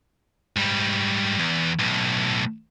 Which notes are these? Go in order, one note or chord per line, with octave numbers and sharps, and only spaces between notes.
G#2 G3
E2
B1 A2